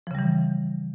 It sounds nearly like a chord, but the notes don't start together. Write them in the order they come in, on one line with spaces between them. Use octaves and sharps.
F3 C#3 G3 E3